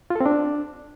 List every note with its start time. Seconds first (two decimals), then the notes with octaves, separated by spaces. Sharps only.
0.10 F4
0.15 A4
0.21 C4
0.26 D4